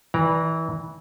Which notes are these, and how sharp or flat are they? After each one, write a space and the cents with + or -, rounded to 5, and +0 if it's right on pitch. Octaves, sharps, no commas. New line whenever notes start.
E3 -25 D5 +0 A#5 +0